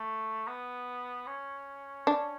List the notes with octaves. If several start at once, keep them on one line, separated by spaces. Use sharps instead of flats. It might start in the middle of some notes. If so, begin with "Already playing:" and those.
Already playing: A3
B3
C#4
D4